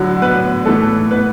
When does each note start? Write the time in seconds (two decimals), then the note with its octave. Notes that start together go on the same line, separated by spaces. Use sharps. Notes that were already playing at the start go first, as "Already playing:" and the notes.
Already playing: A2 D3 F#3 F#4
0.22 B3 B4
0.66 A2 E3 A3 A4
1.11 B3 B4